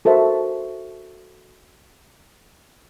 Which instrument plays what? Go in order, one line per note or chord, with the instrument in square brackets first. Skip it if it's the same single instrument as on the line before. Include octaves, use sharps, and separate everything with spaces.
[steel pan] F#4 A4 A#4 C5 E5